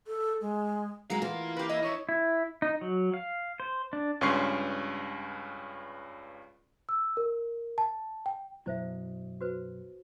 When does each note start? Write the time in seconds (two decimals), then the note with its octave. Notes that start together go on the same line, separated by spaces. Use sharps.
0.07 A4
0.41 G#3
1.10 F#3 G#3 A#4 F5 A#5
1.22 E3 F4
1.56 G4 B4
1.69 E4 D#5
1.83 D#4 C#5 E5
2.09 E4
2.62 D#4
2.81 F#3
3.14 F5
3.60 C5
3.93 D4
4.21 C#2 G2 C#4 C6 C#6 C7
6.89 E6
7.17 A#4
7.78 A5
8.26 G5
8.66 F#2 B2 F#3 E4 C5 E5
9.41 F#4 B4 C5